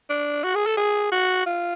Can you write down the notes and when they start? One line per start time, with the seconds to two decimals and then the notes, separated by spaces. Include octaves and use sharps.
0.10 D4
0.44 F#4
0.55 G#4
0.67 A4
0.77 G#4
1.12 F#4
1.46 F4